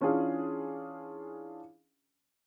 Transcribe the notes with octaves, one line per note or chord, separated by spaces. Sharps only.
E3 C#4 D4 F4 G#4